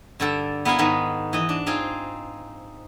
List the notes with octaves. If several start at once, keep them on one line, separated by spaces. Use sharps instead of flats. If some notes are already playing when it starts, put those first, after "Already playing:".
G2 D3 A4
B3 E4 A#4 D#5 F5 G#5
G#2 D#3 B3 D#4
E3 D#5
D4
C4 D#4 F4 G#4